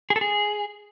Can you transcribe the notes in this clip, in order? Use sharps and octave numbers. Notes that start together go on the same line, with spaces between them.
G#4
A4
G#4